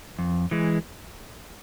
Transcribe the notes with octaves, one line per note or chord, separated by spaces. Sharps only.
F2
E3 G#3